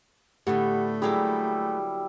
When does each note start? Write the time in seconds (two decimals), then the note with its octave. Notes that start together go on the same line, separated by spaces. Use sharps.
0.47 A2 D3 A3 B3 G4 F#5
1.02 F#3 G3 A#3 E4 G4 G#4